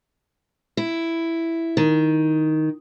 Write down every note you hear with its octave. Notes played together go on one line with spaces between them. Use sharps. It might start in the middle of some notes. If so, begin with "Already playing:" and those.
E4
D#3